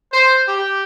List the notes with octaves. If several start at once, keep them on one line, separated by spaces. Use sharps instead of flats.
C5
G4